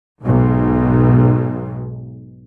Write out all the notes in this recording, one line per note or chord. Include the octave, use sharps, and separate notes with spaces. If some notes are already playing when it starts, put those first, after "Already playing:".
B1 G#2